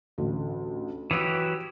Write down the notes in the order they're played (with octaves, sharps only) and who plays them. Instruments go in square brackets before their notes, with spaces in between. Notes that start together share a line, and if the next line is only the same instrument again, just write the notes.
[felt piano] A1 D2
[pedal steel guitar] E3 F#3 G4 [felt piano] D#6 E6 D7